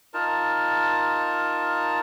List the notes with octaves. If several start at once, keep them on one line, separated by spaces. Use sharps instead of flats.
D#4 F4 A#4 A5